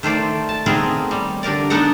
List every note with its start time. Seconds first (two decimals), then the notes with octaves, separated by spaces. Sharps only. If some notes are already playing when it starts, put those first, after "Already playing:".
0.03 D#3 A3 C5 D5
0.49 A5
0.66 D#3 A3 B3 C4 G#4 A#4
1.11 G3
1.43 D3 G4 A#4 D5
1.70 B3 D4 D#4 A4 F#5